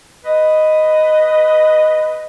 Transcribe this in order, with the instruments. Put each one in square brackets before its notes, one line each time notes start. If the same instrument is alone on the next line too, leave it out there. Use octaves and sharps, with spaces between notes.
[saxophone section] B4 D#5